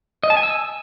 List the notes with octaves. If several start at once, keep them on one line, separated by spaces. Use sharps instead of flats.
D#5
A5
G#5
E6